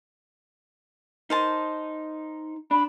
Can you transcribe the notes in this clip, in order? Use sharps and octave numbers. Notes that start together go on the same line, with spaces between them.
D#4 A#4 C5 A5
D4 B5